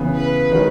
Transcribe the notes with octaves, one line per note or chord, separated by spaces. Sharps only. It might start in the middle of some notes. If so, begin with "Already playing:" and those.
Already playing: C#3 E3 B3
B4
D#3 G#3 C#4 F#4